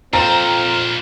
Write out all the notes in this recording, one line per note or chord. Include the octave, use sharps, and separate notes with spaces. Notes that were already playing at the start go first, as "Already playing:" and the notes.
F2 A#2 C4 C5 F5 A#5 F6